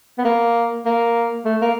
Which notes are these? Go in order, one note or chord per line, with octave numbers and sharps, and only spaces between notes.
B3
A#3
A#3
A3
A#3